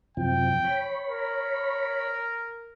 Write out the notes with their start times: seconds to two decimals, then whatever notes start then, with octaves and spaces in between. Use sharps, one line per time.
0.17 F#2 C3 F3 G5
0.64 C#5 B5
1.08 A#4